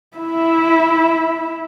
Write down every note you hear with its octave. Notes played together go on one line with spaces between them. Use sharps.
E4 E5